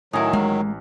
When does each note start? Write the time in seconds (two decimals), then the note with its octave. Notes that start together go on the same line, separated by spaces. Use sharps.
0.13 A2 D#3 F#3 D#4 E4 G#5
0.33 A1 G#3 A#3